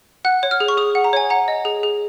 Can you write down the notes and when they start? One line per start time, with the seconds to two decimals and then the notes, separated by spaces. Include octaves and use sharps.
0.25 F#5 F#6
0.43 C#5
0.51 F6
0.60 G#4
0.68 C#6
0.77 G#4 D#6
0.95 F#5
1.04 A#5
1.13 C#5 G#5
1.30 F#5 A#5
1.48 D#5
1.65 G#4
1.83 G#4